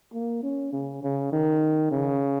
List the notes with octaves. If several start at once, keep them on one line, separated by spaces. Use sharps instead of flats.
A#3
C#4
C#3
C#3
D#3
C#3